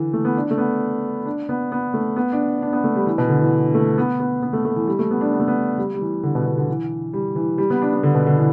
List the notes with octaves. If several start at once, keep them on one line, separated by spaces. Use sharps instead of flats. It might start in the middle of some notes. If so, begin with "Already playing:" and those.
Already playing: D3 E3
A3
B3
D4
A3
B3
D4
B3
B3
A3
B3
D4
D4
B3
A3
G3
E3
B2
D3
E3
A3
B3
B3
B3
A3
A3
E3
G3
A3
B3
D4
B3
A3
B3
G3
G3
E3
D3
B2
B2
D3
E3
G3
E3
G3
B3
D4
B3
D3
B2
D3
E3